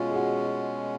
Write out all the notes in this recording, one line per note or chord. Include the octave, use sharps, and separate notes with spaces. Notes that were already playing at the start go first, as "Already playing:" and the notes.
Already playing: B2 G#3 C#4 F4
G#4
F#4
F#4